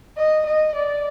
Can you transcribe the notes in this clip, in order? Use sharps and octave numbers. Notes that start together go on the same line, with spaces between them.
D#5
D#5
D5